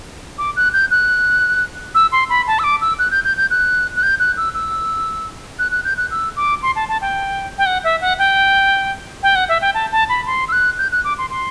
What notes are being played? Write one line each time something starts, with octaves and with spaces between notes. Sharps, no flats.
D6
F#6
G6
F#6
E6
C6
B5
A5
E6
D6
E6
F#6
G6
G6
G6
F#6
F#6
G6
F#6
E6
E6
F#6
F#6
G6
F#6
E6
D6
C6
A5
A5
G5
G5
F#5
E5
F#5
G5
G5
F#5
E5
G5
A5
A5
B5
C6
E6
F#6
G6
F#6
D6
C6
C6